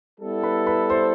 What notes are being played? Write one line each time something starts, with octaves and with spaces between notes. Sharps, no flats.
G3 B3 E4 A4
B4 B5
B4 B5
C5 C6